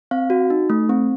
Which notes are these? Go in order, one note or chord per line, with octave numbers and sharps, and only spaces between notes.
C4 F5
F#4
D#4
A3
C4